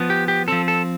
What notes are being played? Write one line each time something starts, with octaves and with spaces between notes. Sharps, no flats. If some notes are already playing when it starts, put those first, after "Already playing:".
Already playing: F3 B3
G4
G4
F3 C4 A4
A4